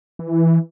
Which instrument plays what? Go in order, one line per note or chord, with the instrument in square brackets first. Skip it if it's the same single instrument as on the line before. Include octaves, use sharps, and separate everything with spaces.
[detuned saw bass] E3